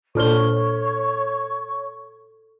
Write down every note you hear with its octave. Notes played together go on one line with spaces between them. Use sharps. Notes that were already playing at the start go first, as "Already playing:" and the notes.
A#2 D4 A4 C5 C#5 C#6 F6 G7